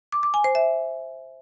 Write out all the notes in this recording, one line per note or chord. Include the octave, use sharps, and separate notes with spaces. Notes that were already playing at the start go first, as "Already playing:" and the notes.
D6
D6
G#5
C5
E5